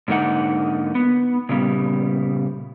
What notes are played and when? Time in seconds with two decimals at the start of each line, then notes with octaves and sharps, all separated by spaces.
0.08 G#2 D3 A#3 D#4 F#5
0.95 B3
1.49 A#2 C#3 G3 B3